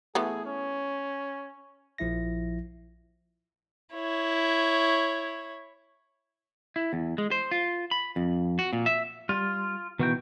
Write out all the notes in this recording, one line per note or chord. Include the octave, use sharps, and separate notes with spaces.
E3 A3 B3 G#4
C#4
A#1 F3 E4 E5 A#6
E4 C#5
E4
E2
G#3
C5
F4
B5
F2
F#4
A#2
E5
G3 F4
B2 D#3 E3 B3 F#4 G5